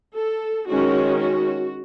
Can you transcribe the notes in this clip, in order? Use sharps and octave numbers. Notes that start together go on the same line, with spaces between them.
A4
D#3 G#3 C#4 F#4
F#4